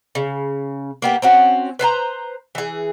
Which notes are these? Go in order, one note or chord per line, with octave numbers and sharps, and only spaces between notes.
C#3
A#3 B3 G4
C4 C#4 F#4
B4 C5 G#5 A#5
E3 G#4